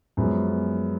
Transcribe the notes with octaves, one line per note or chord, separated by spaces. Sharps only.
F#2 F3 G#3 B3
B3